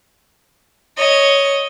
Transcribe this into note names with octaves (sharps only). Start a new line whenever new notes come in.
C#5 D#5